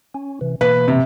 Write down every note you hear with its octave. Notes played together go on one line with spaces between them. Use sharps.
C#4
C3 E3
B2 E3 A#3 B4
C3